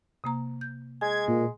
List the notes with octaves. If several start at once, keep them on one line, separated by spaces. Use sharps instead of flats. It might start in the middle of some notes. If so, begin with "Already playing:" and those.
C3 A#3 A#5
G6
G#3 G#5 G#6
A#2